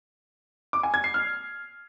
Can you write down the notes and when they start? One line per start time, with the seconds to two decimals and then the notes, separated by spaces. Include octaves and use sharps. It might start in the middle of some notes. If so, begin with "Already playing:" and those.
0.73 D6
0.83 G#5
0.94 G#6
1.04 C7
1.14 F6